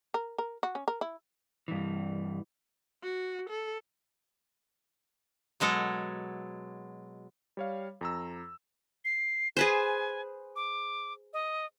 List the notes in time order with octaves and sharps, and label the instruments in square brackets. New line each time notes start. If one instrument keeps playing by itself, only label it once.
[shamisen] A#4
A#4
F#4
C#4
A#4
E4
[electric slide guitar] G2 E3
[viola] F#4
A4
[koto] B2 F#3 G#3 A4
[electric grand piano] G3 C#5 F5
F2 A#5 E6
[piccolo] C7
[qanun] G#4 B4 C5 [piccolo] G#5
[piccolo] D6
D#5